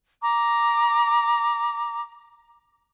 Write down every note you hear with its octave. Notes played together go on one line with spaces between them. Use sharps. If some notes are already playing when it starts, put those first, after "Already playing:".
A#5 D6